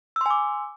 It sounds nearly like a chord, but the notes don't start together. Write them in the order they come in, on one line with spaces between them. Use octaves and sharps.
E6 C6 G#5 D6